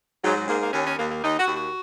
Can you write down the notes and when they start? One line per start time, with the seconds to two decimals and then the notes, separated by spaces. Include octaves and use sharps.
0.23 G#2 F#3
0.36 F#3
0.47 G#2 A#3
0.60 A#3
0.72 D#2 C#4
0.85 C#4
0.98 D#2 A#3
1.10 A#3
1.23 D#2 D#4
1.39 F#4
1.47 D#2
1.56 F#4